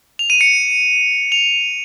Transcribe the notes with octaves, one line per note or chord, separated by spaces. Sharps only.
F7
D#7
C#7
F7